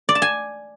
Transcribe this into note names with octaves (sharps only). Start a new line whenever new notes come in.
D5
A5
G#5